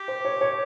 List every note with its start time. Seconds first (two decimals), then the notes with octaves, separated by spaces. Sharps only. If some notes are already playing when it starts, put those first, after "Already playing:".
Already playing: G4
0.08 C5
0.25 C#5
0.41 C#5